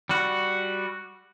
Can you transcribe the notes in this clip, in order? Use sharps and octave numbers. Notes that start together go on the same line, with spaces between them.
G3 F#4